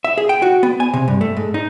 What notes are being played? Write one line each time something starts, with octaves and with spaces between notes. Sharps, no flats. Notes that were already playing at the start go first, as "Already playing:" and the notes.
E5
G#4
G5
F#4
B3
G#5
C3
G2
A3
G#2
D#4